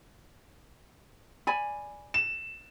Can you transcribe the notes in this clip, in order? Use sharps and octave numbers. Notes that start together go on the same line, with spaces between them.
D5 G#5 B5
E7